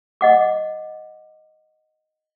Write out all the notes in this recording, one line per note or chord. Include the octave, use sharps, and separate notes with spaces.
D#5 F#5 D6